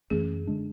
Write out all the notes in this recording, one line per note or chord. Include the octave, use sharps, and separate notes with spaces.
F#2 E3 A3 C#4 G#4
D3 G#3 D4